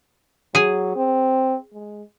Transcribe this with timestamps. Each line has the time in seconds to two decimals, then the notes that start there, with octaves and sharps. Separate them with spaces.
0.55 F#3 G#4 G#5
0.96 C4
1.74 G#3